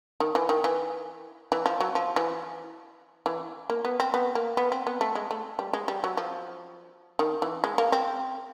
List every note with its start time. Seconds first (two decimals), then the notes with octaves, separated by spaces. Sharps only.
0.20 D#3
0.35 E3
0.49 D#3
0.64 E3
1.52 E3
1.66 F3
1.80 F#3
1.95 F3
2.16 E3
3.26 E3
3.70 A#3
3.85 B3
4.00 C4
4.14 B3
4.35 A#3
4.57 B3
4.72 C4
4.87 B3
5.01 A3
5.15 G#3
5.31 A3
5.59 G3
5.73 G#3
5.88 G3
6.04 F#3
6.17 F3
7.19 D#3
7.42 E3
7.64 G#3
7.78 A#3
7.92 C4